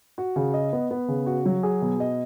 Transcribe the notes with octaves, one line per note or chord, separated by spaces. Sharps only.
F#4
C#3
D#5
B3
B3
C#3
F#4
F#3
G#4
B2
D#5